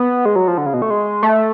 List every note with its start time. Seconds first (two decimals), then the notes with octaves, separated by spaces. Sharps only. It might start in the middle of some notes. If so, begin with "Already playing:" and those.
Already playing: B3
0.25 G#3
0.36 F#3
0.48 F3
0.58 D3
0.66 C#3
0.74 B2
0.82 A3
0.90 G#3
1.23 A3